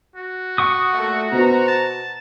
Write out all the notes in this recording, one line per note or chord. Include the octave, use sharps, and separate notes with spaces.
F#4
F#5 C#6 D#6
A#2 A3
B2 B3 C5 A#5
A5